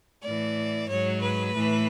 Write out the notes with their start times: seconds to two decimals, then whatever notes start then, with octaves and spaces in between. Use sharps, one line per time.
0.23 A2 E3 D5
0.88 G#2 F#3 C#5
1.21 B4
1.54 A2 E3